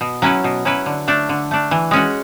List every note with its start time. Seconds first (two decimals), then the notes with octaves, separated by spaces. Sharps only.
0.01 B2
0.22 F#3 C#4 E4 B4
0.44 B2
0.65 F#3 C#4 E4 B4
0.86 D3
1.08 A3 D4
1.29 D3
1.51 A3 D4
1.71 E3
1.91 G#3 C#4 F#4